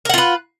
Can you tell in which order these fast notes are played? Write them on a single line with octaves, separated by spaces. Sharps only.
A#4 F#5 F4 B4